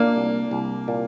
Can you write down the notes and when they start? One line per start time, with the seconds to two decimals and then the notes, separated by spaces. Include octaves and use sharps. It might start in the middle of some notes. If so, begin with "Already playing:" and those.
Already playing: A#2 A#3 D4
0.16 C2
0.51 C2
0.88 A#2